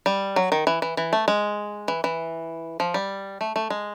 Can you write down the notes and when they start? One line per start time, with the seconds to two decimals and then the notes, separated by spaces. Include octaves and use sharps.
0.06 G3
0.36 F#3
0.52 D#3
0.67 E3
0.82 E3
0.97 E3
1.13 A3
1.28 G#3
1.88 E3
2.04 E3
2.80 F3
2.94 G3
3.41 A3
3.56 A3
3.70 G#3